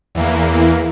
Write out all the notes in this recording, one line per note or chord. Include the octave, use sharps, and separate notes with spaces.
E2 E3 A#3